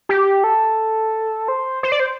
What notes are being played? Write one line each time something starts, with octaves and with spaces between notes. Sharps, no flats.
G4
A4
C5
C5
D5
C5